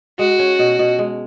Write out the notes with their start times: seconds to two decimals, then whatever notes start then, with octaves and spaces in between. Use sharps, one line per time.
0.19 G#3 F#4
0.39 C#4
0.59 B2
0.79 B2
0.99 G#3